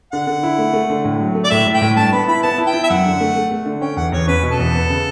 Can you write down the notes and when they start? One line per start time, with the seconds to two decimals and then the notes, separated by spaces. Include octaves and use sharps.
0.13 D3 F#5
0.27 D3
0.43 E4
0.59 A3
0.73 A3
0.90 D3
1.05 A2
1.20 F#3
1.35 A3
1.45 D5
1.50 A2 E5
1.67 A2
1.74 G5
1.82 A2
1.97 G2 A5
2.12 B3 B5
2.28 E4 B5
2.43 B3 A5
2.58 E4
2.67 G5
2.74 E4
2.84 E5
2.90 F#2 F#5
3.05 D3
3.21 A3
3.36 A3
3.52 A3
3.66 D3
3.81 C#4 G5
3.97 E2 F#5
4.12 E2 C#5
4.28 C#4 B4
4.43 B2
4.51 A4
4.59 E2
4.75 B3
4.90 C#3